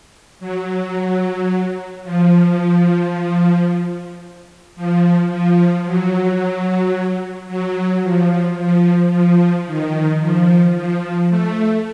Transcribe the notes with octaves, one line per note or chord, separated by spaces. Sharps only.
F#3
F3
F3
F3
F#3
F#3
F3
F3
F3
D#3
F3
F3
A3